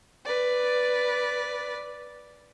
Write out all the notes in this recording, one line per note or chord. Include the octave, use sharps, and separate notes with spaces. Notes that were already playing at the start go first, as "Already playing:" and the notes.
B4 D5